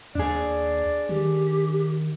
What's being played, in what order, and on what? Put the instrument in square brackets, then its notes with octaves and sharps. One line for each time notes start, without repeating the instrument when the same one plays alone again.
[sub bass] D#2 [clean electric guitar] D4 G#4 [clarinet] D5
[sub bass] D#3 [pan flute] G4